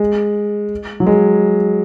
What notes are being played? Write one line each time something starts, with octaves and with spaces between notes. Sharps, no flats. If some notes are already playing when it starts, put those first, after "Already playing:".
Already playing: G#3
F#3
G#3